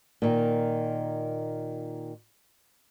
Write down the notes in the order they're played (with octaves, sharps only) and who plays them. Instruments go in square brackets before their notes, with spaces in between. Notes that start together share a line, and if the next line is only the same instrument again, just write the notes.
[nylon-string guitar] A#2 D#3